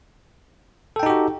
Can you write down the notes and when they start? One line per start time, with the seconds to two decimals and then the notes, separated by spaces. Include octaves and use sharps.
0.96 A4
1.00 G5
1.03 D#4
1.06 G4
1.10 F#4